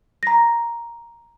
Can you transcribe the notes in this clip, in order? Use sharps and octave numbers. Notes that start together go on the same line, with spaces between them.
A#5 A#6